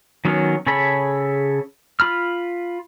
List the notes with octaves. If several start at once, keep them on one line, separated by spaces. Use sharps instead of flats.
D#3 F#3 B3 C#4
C#3 G#4 A4 C#5 B5
F4 B5 F6